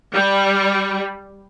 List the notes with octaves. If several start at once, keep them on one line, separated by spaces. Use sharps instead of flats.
G3